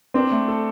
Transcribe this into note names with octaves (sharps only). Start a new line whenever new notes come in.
C4 D4
A3
A4